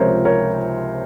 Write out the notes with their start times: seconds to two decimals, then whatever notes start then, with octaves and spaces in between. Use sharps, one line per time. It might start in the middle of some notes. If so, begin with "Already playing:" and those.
Already playing: C#2 C3 F3 A#4 C5 C#5
0.25 A#4 C#5